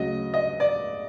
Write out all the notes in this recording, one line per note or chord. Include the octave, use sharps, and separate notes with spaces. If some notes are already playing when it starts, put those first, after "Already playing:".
Already playing: D2 C#3 F#3 D#5
D#5
D5